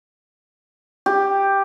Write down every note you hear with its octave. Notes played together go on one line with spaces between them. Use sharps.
G4